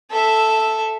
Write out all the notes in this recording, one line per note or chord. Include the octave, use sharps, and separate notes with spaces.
A4 E5